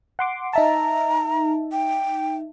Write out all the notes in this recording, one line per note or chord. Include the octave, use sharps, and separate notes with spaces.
F#5 C6 D6
D#4 E5 A5 A#5
G5